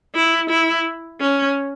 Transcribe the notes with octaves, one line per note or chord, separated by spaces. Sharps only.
E4
E4
C#4